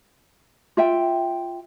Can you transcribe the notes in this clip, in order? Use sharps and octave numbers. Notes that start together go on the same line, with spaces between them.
F4 E5 G5